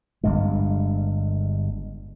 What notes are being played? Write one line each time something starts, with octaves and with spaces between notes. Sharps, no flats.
G1 G2 G#3